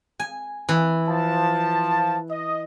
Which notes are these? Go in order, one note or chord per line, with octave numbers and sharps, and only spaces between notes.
G#5
E3
F3 A5
D#5